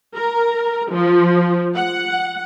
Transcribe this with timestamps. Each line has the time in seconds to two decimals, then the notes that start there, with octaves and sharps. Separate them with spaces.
0.15 A#4
0.91 F3
1.76 F#5